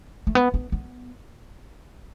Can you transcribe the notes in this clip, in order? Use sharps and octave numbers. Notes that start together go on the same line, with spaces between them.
A3
B3
B3
B3